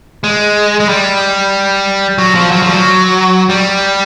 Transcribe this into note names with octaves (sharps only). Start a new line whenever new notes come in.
G#3
G#3
G3
F#3
F3
F#3
F3
G3
F#3
G3